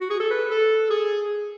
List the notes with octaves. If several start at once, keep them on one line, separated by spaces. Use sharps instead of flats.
F#4
G#4
A4
B4
A4
G#4